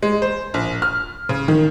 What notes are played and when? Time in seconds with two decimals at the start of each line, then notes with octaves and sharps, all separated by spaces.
0.02 G#3
0.22 C5
0.54 A#1
0.82 F6
1.29 C#3
1.48 D#3